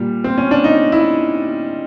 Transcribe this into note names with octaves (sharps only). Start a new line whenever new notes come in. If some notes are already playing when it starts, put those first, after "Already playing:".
Already playing: A#2 G3
C4
C#4
D4
D#4
E4